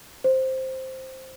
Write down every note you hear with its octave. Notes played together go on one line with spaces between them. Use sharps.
C5